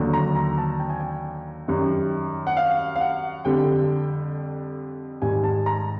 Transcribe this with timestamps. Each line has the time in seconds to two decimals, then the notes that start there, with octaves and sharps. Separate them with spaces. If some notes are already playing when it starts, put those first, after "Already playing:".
Already playing: D#2 D3 F#3
0.13 A#5
0.36 A#5
0.58 A5
0.80 G5
0.90 G#5
1.00 G5
1.68 F#2 D#3 G3
2.47 F#5
2.57 F5
2.96 F5
3.01 F#5
3.45 F2 D3 G3 G5
5.22 G#2 D#3 G3 G#5
5.44 A5
5.66 A#5